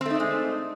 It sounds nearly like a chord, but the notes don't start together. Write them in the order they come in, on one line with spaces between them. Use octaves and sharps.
C4 A3 D#4 D4 G#3